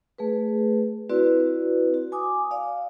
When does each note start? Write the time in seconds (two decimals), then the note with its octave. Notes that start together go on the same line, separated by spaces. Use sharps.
0.18 A3 G#4 B4
1.10 C4 E4 F#4 B4 D5
1.94 F#4
2.12 G#5 D6 D#6
2.51 D5 F5